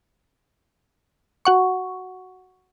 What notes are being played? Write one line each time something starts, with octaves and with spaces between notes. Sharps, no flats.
F#4 F#5 C#6